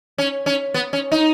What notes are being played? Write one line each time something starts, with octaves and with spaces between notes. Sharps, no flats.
C#4
C#4
B3
C#4
D#4